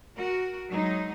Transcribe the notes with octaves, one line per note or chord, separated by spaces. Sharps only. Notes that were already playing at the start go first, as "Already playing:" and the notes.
F#4 A#4
F#3 G#3 D#4